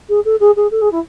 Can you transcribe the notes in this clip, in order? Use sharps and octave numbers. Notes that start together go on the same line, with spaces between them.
G#4
A4
G#4
G#4
A4
G#4
E4